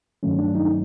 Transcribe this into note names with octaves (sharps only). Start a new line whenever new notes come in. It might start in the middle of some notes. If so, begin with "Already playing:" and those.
G2 D#3 F#3 A3 C#4
D4
D#4